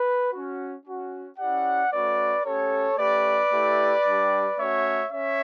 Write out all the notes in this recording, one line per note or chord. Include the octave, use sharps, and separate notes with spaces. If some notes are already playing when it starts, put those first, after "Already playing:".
Already playing: B4
C#4 F#4
C#4 F#4
C#4 E4 G4 D5 F#5
A3 C#4 F#4 B4 D5
A3 C#4 G4 A4 C#5
A3 C#4 G4 B4 D5
A3 E4 G4
G3 D4 G4
A3 C#4 F#4 C#5 E5
C#4 C#5 E5